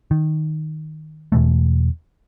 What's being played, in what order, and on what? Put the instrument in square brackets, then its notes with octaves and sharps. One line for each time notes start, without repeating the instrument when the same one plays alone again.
[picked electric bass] D#3
E2 B2 E3 A3